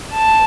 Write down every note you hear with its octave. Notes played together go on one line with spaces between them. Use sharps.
A5